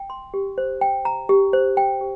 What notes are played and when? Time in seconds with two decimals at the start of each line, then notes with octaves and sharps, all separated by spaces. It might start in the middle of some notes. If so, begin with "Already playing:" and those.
Already playing: G5
0.10 C6
0.34 G4
0.58 C5
0.81 G5
1.05 A#5
1.29 G4
1.53 C5
1.77 G5
2.01 G4